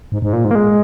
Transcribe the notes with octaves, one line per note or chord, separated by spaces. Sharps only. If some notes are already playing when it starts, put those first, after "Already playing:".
G#2
G#2
A#2
G#2
A#3
G#3